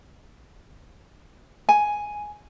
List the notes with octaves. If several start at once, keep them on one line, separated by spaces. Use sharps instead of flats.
G#5